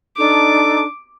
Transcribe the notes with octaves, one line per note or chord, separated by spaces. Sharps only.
D4 D#4 A4 D6